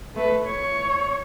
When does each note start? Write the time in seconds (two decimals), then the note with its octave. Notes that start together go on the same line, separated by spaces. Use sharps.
0.15 A3 B4
0.46 C#5